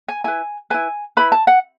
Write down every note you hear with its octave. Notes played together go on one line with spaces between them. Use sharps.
G#5
E4 B4 G#5
E4 B4 G#5
E4 B4 B5
A5
F#5